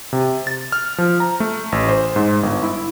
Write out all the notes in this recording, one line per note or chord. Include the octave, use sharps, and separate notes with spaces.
C3
A6
F6
F3
A#5
A3
A1
C5
G#2
G1
E4